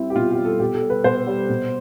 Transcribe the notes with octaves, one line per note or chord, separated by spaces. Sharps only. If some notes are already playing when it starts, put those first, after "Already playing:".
Already playing: G3 C4 E4
G4
B2 F4
G4
G3
A4
B2 G4
A4
G3
B4
B2 C5
G3
B2